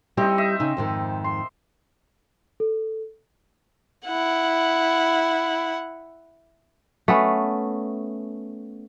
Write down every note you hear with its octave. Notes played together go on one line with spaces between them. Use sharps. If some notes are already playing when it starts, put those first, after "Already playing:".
G3 C4 D#4 E4 G4
D#5 E5
C#3 D#4
F2 G#2 D#3
C6
A4
E4 F#5
A3 B3 C#4